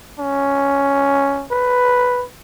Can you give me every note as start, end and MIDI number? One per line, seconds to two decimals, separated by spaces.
0.19 1.45 61
1.51 2.25 71